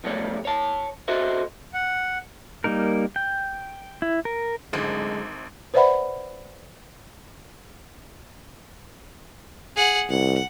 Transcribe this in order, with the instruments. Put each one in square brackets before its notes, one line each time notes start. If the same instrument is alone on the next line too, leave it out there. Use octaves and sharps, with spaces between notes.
[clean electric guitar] B1 F2 G3 A3 C#5
C#5 A5
F#4 A4 C5 D#5 E5
[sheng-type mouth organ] F#5
[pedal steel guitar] G3 A#3 D#4 A#4
G5
E4
A#4
[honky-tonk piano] G#1 [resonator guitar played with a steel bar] F#2 A2 D3 [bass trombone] G#3
[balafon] B4 C5 D5 E5 F#5 B5
[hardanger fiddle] G#4 F#5
[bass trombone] C2 [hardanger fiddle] F#5